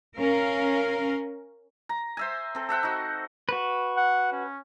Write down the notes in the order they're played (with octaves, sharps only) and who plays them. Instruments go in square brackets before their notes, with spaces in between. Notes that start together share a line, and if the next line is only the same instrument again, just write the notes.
[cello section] C#4 A#4 F5
[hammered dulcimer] A#5
C5 E5 G#5
C4 A4
A4 E5 F#5 G5
D#4 F#4
[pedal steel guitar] F#4 B4
[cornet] F#5
C#4